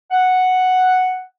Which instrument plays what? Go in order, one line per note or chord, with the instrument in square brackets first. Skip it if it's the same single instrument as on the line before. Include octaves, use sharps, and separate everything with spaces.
[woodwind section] F#5